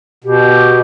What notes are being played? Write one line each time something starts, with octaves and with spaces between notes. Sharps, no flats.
B2 G4